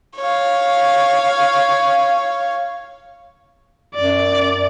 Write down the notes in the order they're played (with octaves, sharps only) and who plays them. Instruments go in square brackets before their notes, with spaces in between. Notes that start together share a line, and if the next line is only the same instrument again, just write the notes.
[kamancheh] C#5 F5
[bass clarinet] F#2 [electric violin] D5